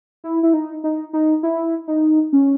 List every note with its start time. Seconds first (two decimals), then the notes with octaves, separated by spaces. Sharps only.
0.24 E4
0.43 E4
0.54 D#4
0.84 D#4
1.13 D#4
1.43 E4
1.88 D#4
2.33 C#4